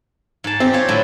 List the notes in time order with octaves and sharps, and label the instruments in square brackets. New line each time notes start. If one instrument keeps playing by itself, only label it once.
[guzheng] G#2 A5
[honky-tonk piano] C4 [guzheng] G4
[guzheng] F4 C#5
A2 D3 F#3